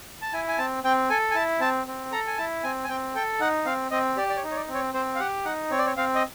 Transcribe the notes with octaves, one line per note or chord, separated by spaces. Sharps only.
A5
E4 G#5
G#5
C4 A5
C4 G5
A4 G#5
G#5
E4 A5
C4 A5
C4
A4 A#5
G#5
E4 A5
C4 G#5
G#5
C4 G5
A4 G5
D#4 F#5
C4 F5
C4 D#5
G4 D5
D5
C#5
D#4
C#5
D5
C4
C#5
C4 C5
F5
G4 F#5
D#4 F#5
C4 C#5
D5
C#5
C4 F5
D#5